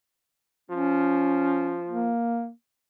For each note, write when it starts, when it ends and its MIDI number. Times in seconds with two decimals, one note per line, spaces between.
0.70 2.12 53
0.70 1.79 61
1.88 2.50 58